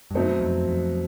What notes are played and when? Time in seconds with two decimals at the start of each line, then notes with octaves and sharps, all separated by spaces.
0.11 G2
0.14 F#2 B2 F#3 A3 C4 D#4
0.41 F2
0.68 F2